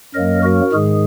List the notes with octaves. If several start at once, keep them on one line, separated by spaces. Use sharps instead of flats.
F#2 F#3 A#3 A#4 D#5
F#4 A#4
G#2 D#3 G#3 G#4